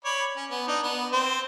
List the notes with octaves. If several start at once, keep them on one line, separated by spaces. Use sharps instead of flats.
C#5 D5 B5
C#4
B3
D4 D#4
B3
C4 C5